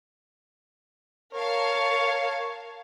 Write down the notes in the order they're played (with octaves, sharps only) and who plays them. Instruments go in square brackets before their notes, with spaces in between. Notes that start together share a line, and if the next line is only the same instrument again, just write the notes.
[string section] A#4 F5 A5 [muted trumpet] C#5